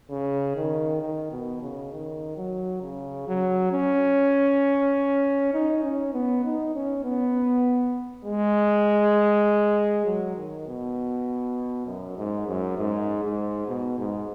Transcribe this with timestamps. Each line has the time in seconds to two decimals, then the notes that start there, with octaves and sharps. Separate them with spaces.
0.10 C#3
0.56 D#3
1.01 D#3
1.32 B2
1.62 C#3
1.92 D#3
2.37 F#3
2.82 C#3
3.27 F#3
3.72 C#4
5.54 D#4
5.84 C#4
6.13 B3
6.44 D#4
6.75 C#4
7.04 B3
8.25 G#3
10.05 F#3
10.36 D#3
10.67 B2
11.86 F#2
12.17 G#2
12.48 F#2
12.78 G#2
13.23 G#2
13.68 B2
13.98 G#2